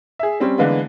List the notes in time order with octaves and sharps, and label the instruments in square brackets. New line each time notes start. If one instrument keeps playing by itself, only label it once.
[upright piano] G#4 E5
G3 C4 C#4
D3 E3 G#3 A#3 B3